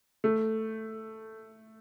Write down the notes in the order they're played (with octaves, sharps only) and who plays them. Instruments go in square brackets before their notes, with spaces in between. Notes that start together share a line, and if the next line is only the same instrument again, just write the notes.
[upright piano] A3